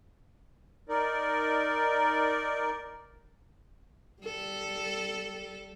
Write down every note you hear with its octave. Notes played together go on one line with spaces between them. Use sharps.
D#4 A#4 D5
G3 A4